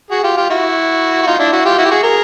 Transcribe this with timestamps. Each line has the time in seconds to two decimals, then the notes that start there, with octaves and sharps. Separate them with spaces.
0.11 F#4 G#4
0.24 F4 G4
0.37 F4 G4
0.50 E4 F#4
1.23 F#4
1.27 D#4 F4
1.39 D4 E4
1.53 E4 F#4
1.65 F4 G4
1.78 E4 F#4
1.85 G4
1.91 F#4 G#4
2.03 G#4 A#4